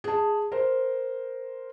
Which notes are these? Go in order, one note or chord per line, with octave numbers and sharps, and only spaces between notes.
G#4 A5
A#4 C5